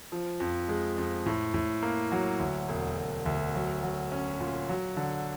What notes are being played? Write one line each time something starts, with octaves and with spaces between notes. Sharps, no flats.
F3
F2
G#3
F2
A2
A2
A#3
F#3
D2
E1
E1
D2
F#3
F#3
C#4
A#2
F#3
D3